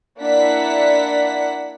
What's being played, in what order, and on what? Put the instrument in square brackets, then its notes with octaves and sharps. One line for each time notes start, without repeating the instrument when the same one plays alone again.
[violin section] A#3 D4 E4 F#5 B6